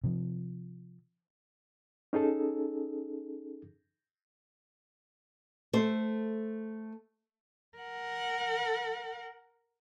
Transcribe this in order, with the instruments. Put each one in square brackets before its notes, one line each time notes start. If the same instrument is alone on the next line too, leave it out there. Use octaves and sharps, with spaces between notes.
[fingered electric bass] C3 F3
[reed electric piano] C#4 D#4 G#4 A4
[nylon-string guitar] A3 C5
[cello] A#4 F#5